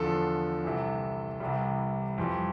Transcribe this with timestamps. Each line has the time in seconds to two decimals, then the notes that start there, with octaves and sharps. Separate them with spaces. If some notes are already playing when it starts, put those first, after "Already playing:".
Already playing: E2 D3 F3 A4
0.64 C2 C3 E3
1.40 C2 C3 E3 G3
2.18 F2 E3 G3